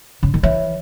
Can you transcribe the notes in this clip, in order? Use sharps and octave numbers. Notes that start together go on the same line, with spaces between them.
C#3
D#3
E3 C#5 E5